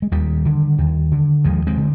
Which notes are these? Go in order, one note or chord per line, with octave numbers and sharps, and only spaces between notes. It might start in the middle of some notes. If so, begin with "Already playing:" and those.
G#3
D#2 D#3 G3
D3
D#2
D3
D#2 F3 G#3
G#3 C4
D3